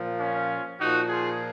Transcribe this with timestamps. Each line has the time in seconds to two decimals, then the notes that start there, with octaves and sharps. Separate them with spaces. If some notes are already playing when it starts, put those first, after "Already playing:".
Already playing: A#2 F3
0.19 C#4 F4
0.79 A#2 F3 D#4 F#4
1.09 F4 G#4